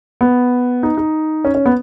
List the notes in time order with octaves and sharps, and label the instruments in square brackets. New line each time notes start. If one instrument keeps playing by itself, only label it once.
[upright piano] B3
D#4
D#4
C#4
C#4
B3